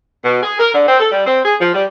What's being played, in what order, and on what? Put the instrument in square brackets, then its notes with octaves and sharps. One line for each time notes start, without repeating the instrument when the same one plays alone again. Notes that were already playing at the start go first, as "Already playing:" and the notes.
[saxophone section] B2
G#4
A#4
D3
C4
A4
G3
C4
G#4
F3
G3